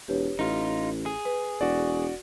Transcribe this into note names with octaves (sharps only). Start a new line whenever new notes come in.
E1 G4 B4 C#5
A1 D#4 F4
G#4
B4
E1 F#4 D5